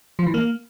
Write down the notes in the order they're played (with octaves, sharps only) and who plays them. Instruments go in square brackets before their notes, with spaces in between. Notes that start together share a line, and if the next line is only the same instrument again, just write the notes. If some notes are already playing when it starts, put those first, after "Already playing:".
[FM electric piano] F3
E3
A#3